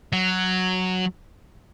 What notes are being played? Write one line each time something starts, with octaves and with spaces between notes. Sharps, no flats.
F#3